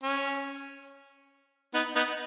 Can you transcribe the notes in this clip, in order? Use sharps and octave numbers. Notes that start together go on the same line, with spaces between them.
C#4
B3 D#4
B3 D#4